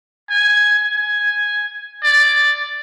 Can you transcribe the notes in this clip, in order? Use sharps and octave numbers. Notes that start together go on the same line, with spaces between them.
G#5
G#5
D5